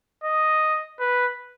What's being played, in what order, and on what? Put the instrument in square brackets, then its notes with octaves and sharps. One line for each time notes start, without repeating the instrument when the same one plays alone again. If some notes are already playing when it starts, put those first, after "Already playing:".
[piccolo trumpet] D#5
B4